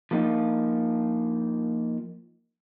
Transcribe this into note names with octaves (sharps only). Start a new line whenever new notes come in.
F3 A#3 D#4 F4